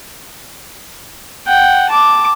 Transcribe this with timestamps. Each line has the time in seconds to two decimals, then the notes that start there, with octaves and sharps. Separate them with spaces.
1.47 F#5 G5
1.89 A5 D6